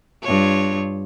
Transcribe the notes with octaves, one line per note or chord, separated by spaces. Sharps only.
G2 F4 C#5